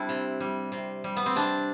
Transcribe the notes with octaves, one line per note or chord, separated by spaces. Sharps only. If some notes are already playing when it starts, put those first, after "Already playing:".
Already playing: G3 C4 D4 E4
C3
G3
C3
G3
B3
C4
C3 D4